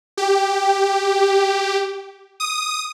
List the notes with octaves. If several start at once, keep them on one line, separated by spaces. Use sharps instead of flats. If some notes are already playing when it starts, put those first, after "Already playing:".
G4
D#6